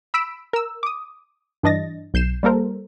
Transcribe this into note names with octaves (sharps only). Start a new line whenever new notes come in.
B5 E6 B6 D7 E7
A#4 E6
D6 D#6
G2 E3 D4 D#5 A6 A#6
B1 G6 C7 E7
G3 A#3 A4 A#4 C5